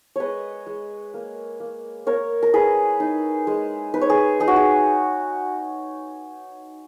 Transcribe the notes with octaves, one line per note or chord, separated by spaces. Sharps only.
G#3 B4 C#5 D#5
G#3
A#3
A#3
A#3 A#4 C#5
A#4
E4 G#4 B4
D#4
G#3
D#4 B4
C#5
G#4 B4
D#4 G#4
F#4
G#4